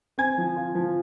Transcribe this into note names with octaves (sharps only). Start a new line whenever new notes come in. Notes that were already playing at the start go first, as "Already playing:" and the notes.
C4 G#5 G#6
F3
F4
F3